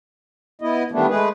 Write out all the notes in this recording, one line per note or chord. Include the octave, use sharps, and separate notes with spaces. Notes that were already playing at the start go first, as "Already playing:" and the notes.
B3 E4 D#5
D#3 E3 G3 A3 B3 D4
G#3 A3 G#4 B4